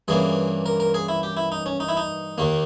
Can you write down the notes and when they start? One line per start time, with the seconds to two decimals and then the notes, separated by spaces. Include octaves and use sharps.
0.08 G2 E3 A#3 C#4 G#4
0.66 A#4
0.80 A#4
0.94 G#4
1.09 E4
1.23 G4
1.37 E4
1.52 D#4
1.66 C#4
1.80 D#4
1.89 E4
1.97 D#4
2.38 D#2 D#3 A#3